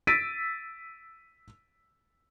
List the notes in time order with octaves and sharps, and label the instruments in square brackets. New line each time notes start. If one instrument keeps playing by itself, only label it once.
[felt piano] E6 A6 B6 D7 D#7